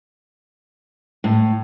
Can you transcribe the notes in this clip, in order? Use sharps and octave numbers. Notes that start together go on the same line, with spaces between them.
A2